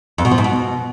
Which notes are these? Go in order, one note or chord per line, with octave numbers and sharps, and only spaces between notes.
F2
B2
F3
G#2
B2